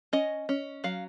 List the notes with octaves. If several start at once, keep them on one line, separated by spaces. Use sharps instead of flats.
C#4 D#5
C#4
F#3 F5